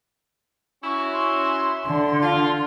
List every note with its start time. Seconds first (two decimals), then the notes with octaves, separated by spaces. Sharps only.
0.83 C#4 E4 F#4 C#6
1.12 C6
1.87 D3 C6
2.22 F4